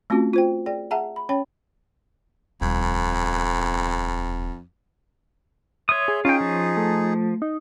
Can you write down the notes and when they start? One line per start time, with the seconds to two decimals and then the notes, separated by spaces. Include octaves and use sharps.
0.10 A3 C4 C#4 F4 F#4
0.34 F4 C5 G5
0.66 G#4 D5 G5
0.91 G#4 E5 F#5 A5 A#5
1.16 B5
1.29 C#4 C#5 G5 B5
2.61 D#1 F2
5.89 C#5 E5 C6 D#6
6.08 G#4
6.25 C#4 D#4 F4 G#4 G5
6.40 F3
6.77 A3
7.42 D#4